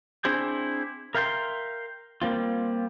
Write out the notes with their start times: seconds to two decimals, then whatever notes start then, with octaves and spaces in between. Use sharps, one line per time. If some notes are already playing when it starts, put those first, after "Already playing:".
0.25 C4 D4 E4 G#4 C5 G5
1.15 A#4 E5 F5 G5 G#5 C6
2.22 G3 A#3 C4 F4